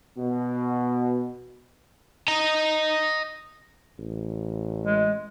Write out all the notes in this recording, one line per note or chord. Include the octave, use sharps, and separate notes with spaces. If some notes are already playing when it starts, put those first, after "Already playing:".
B2
D#5 A#5
A1
G#3